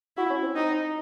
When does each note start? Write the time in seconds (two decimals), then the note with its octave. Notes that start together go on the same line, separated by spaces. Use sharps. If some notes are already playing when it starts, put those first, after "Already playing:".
0.17 E4 F#4
0.30 C#4
0.42 C4
0.56 D#4